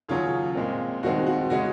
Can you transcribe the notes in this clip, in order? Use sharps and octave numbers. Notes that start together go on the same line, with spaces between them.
D#2 C#3 F#3 C#4 F4 G#4
A#2 G#3 C4
D#2 D#3 G#3 C4 F#4
F#4
C#3 G#3 C#4 F#4